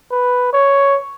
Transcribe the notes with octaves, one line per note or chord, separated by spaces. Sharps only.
B4
C#5